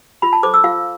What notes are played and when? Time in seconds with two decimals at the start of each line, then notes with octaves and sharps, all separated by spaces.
0.22 F4 B5
0.33 A5
0.43 A4 C5 D6
0.54 E6
0.64 F4 F5